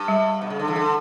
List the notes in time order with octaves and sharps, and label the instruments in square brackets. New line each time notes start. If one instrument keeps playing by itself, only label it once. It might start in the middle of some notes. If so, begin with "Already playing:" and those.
Already playing: [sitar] G2
[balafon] G3
[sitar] B2
C#3
D3
C#3 E3
D3